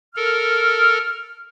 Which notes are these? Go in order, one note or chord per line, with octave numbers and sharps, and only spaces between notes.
A4 A#4 F6